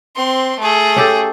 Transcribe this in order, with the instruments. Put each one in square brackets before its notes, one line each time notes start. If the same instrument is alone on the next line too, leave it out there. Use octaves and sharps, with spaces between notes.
[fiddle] C4 C6
A3 G#4
[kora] C#4 G4 A4